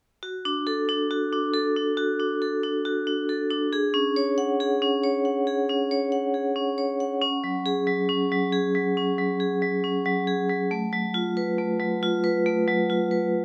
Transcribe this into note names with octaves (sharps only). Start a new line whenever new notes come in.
F#4
D4
A4
D4
F#4
D4
A4
D4
F#4
D4
A4
D4
F#4
D4
A4
D4
G#4
C#4
C#5
F#5
G#4
C#4
C#5
F#5
G#4
C#4
C#5
F#5
G#4
C#4
C#5
F#5
C#4
F#3
G#4
F#3
C#4
F#3
G#4
F#3
C#4
F#3
G#4
F#3
C#4
F#3
G#4
F#3
A3
F#3
F4
B4
A3
F#3
F4
B4
A3
F#3
F4
B4